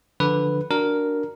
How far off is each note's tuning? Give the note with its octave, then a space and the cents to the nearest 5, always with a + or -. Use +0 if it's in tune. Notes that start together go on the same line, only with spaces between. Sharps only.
D3 +0 F3 +0 B4 +0
D4 +0 F#4 +0 A#4 +0